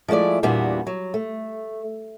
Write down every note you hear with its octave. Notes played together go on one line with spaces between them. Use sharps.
F3 G#3 A3 E4 D5
E2 A#2 G3 B3 D4 F#4
F#3
A3